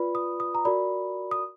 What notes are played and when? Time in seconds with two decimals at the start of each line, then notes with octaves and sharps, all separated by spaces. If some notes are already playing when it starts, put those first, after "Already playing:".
Already playing: F4 B4 D5 B5
0.15 D#6
0.40 D#6
0.55 A#5
0.65 F#4 A#4 D5 B5
1.31 D#6